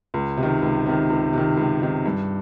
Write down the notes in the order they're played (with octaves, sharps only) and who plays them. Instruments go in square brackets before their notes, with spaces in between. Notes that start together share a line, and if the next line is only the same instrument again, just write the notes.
[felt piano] C#2
C3
D#3
C#2
C3 D#3
C#2
C3 D#3
C#2
C3 D#3
G2